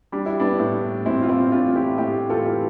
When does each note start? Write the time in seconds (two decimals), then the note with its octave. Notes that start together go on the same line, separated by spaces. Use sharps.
0.12 G3 D4
0.26 E4
0.40 B3 D4
0.59 A2
1.06 A2 C4 E4
1.22 F4
1.29 C4 E4
1.52 A2 D4 F4
1.75 E4 G4
1.98 A2 E4 G4
2.29 F4 A4
2.45 E3